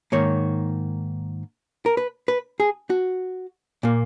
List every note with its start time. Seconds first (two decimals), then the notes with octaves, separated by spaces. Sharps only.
0.12 G#2 D#3 A#3 C#5
1.86 A#4
1.97 B4
2.28 B4
2.60 G#4
2.90 F#4
3.83 A#2 A#3